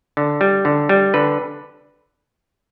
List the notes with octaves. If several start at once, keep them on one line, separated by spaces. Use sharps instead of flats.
D3
G3
D3
G3
D3 B4